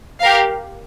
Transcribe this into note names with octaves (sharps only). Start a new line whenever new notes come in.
G4 A#4 F5